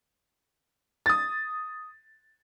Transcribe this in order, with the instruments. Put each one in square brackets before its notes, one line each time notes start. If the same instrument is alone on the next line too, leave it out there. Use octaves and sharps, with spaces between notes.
[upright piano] D#6 A6